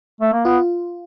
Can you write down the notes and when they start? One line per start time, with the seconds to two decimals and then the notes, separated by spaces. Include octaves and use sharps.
0.21 A3
0.33 A#3
0.45 B3 F4